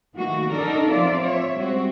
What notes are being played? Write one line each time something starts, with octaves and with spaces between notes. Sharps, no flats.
D#3 E3 A3 A#3 F#4
D4 D#4 A4 A#4 D5
F3 C4 F4 D5 E5
F3 C#5 E5
G3 G#3 C4 F#4